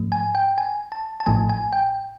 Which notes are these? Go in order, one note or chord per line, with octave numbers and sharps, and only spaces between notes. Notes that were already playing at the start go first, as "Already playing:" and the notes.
Already playing: G#2 F3 A3
G#5
G5
G#5
A5
A5
A1 A2 F3 A3 G#5
G#5
G5